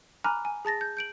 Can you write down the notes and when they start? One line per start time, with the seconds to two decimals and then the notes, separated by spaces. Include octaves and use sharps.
0.24 G#5 A#5 B5 D6 F6 F#6
0.45 G#5
0.65 G#4 A5 A6 A#6
0.81 G6
0.97 G6 D7 F#7